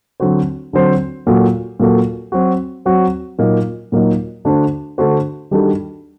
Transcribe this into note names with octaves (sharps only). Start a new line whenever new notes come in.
D3 F#3 C4 F#4 C5
D3 F#3 C4 F#4 C5
A#2 F#3 A#3 F#4 A4
A#2 F#3 A#3 F#4 A4
F#3 C4 F#4
F#3 C4 F#4
A#2 F#3 A#3 D#4
A#2 F#3 A#3 D#4
D3 A3 D4 F#4 C5
D3 A3 D4 F#4 C5
D#3 G3 D4 F#4 A4